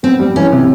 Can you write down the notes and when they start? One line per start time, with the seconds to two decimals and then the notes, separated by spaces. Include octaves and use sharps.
0.03 B3 C4
0.19 G3
0.36 E3 C#4
0.52 C3